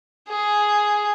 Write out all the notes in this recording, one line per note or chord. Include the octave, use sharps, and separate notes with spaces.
G#4